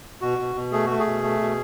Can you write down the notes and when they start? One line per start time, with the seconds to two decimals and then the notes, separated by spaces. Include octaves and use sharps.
0.22 B2 F#4
0.38 B2
0.55 B2
0.72 A3 G#4
0.86 A3 F#4
0.99 G#4
1.06 B2
1.23 A3
1.40 B2